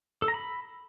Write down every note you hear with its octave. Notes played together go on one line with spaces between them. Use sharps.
A4
A#5
B5